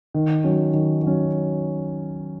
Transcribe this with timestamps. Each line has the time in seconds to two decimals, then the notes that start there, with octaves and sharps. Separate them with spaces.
0.14 D#3
0.44 F#3 C#4
0.74 D#3
1.02 F#3 C#4